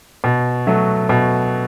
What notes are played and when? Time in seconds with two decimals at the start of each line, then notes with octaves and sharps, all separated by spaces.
0.24 B2
0.67 F#3 A3
1.09 B2